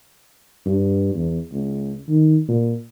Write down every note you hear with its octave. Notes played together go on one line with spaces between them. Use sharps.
G2
E2
C#2
D#3
A#2